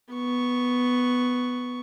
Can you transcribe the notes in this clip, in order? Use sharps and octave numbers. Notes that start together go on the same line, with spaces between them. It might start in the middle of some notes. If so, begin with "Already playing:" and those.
B3 C#6